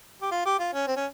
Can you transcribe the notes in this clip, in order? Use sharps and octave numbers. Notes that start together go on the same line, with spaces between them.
G4
F4
G4
F4
C#4
C4
C#4